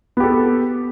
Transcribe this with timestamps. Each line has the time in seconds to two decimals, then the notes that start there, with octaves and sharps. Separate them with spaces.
0.17 B3
0.20 G4
0.24 A4